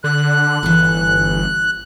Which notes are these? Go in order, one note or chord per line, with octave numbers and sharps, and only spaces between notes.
D3 F#6
G1 E3 A4